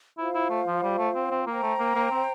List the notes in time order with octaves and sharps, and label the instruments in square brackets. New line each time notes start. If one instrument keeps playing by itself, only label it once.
[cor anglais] E4 [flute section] F4 C5 F5
[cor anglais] E4
A3
F3
G3
A3
C4
C4
[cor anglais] A#3 [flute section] C5 G5 A#5
[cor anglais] A3
A#3
A#3
C4